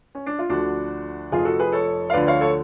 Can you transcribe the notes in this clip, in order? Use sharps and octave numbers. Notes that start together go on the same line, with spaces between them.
C#4
D4
F4
D2 D3 F3 D4 F#4
F1 F2 F3 F4 G#4
F#4 A4
G#4 B4
A4 C#5
F5
D2 D3 F3 B4 D5
C#5 F5
A4 C#5